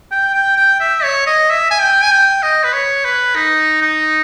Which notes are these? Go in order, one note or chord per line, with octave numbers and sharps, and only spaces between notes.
G5
G5
G5
E5
C#5
D#5
E5
G#5
G5
G#5
G5
D#5
B4
C#5
B4
D#4
D#4